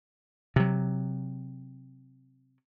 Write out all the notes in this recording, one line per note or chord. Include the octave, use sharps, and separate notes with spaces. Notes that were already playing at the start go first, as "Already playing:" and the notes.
C3 F#3